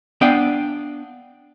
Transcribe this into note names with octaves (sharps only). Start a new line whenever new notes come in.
B3 D4 F5 G5